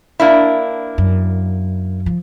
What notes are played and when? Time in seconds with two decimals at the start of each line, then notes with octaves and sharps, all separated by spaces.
0.20 A#3 D4 E4
0.98 F#2
2.06 F3